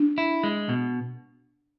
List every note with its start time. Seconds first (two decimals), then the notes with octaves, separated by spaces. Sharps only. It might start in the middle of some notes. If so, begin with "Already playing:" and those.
Already playing: D4
0.18 E4
0.44 G#3
0.69 B2